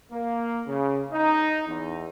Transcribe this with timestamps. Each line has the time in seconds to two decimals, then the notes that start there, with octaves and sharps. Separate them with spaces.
0.12 A#3
0.67 C#3
1.12 D#4
1.68 E2